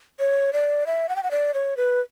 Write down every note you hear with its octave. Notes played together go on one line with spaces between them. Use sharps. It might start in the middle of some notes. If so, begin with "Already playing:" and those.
C#5
D5
E5
F#5
G5
F#5
D5
C#5
B4